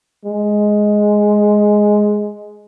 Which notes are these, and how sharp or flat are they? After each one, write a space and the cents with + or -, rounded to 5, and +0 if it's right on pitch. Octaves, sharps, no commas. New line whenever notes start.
G#3 +5